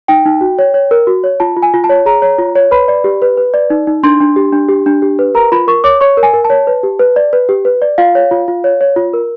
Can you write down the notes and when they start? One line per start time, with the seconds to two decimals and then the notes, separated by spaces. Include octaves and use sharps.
0.08 D#4 G5
0.25 D#4
0.41 F#4
0.59 C#5
0.74 C#5
0.91 A#4
1.07 F#4
1.24 C#5
1.40 F4 A5
1.57 F4
1.62 G#5
1.74 F4
1.84 A5
1.89 C#5
2.06 G#4 A#5
2.22 C#5
2.39 F4
2.55 C#5
2.71 B4 B5
2.88 D5
3.04 G4
3.22 B4
3.37 B4
3.54 D5
3.70 D#4
3.87 D#4
4.03 D4 C6
4.20 D4
4.36 G4
4.53 D4
4.69 G4
4.86 D4
5.02 G4
5.19 B4
5.35 A#4 A#5
5.52 F4 B5
5.68 A#4 C#6
5.84 C#5 D6
6.01 C#5 C#6
6.17 A#4
6.23 G#5
6.33 A#4
6.45 A5
6.50 C#5
6.67 B4
6.83 G4
6.99 B4
7.16 D5
7.33 B4
7.49 G4
7.65 B4
7.82 D5
7.98 F4 F5
8.15 C#5
8.31 F4
8.48 F4
8.64 C#5
8.81 C#5
8.96 F4
9.13 A#4